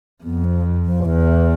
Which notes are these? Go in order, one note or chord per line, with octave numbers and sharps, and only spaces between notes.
F2 B3
F3
F3
E2 E3